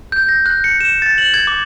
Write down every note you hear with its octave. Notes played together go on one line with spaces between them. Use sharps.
G6
A#6
F#6
C#7
E7
A6
F#7
G#6
D6